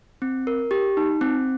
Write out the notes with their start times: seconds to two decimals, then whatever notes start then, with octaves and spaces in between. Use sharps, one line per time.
0.22 C4
0.47 A#4
0.71 G4
0.97 D#4
1.21 C4